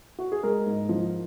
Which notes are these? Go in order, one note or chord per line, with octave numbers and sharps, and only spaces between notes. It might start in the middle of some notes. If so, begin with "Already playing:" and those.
F#4
G#4
G#3 A#4
G#2
F3